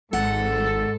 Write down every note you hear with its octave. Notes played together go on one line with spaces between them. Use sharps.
G#1 G#2 A4 F#5